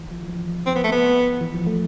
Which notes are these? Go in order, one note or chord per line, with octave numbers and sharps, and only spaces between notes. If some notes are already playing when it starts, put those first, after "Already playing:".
Already playing: E3
F3
E3
F3
F3
C4
B3
A3
B3
E3
F3
A3